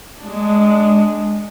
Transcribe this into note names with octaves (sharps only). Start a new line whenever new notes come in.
G#3 D4